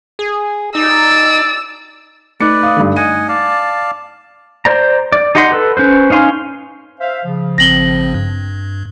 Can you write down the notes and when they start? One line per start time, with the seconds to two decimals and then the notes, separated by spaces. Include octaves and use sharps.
0.19 G#4
0.75 D#4 D5 E6
2.41 A3 D#4 B4 D5 C#7
2.63 F5 D#6
2.77 G2 D3
2.96 D#5 F#5 G#5 D#7
3.29 D5 F5 A5
4.65 C5 D5 A#5
5.12 D5
5.35 D#4 G4 D#5 F#5 C6
5.52 A4 B4
5.77 C#4 B4 C5
6.10 C#4 D#4 F5 G#5 C6
7.00 C5 E5 F5
7.24 C#3 F3
7.58 G#1 C4 A#6 F#7 G7
8.14 G2